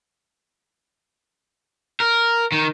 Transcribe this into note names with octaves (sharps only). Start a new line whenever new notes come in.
A#4
D#3